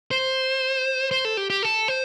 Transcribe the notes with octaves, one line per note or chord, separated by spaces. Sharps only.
C5
C5
A4
G4
G4
A4
C5